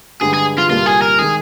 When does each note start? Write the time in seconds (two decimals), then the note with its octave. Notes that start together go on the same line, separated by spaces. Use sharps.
0.21 G2 D3 G#3 D4 G4 G#4
0.33 G#4
0.58 F4
0.70 C2 A#2 G3 A#3 F4
0.86 G#4
1.02 A#4
1.19 D#3 G#3 G#4